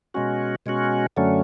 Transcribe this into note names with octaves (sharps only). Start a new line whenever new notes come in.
B2 G#3 C#4 F#4
B2 G#3 C#4 F#4
F#2 D3 F#3 A3 C#4